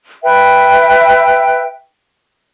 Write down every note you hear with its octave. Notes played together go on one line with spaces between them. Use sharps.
B4 E5 G5